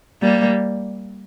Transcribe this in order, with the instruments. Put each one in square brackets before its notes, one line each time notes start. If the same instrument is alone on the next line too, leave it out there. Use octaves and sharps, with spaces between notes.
[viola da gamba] G3 A#3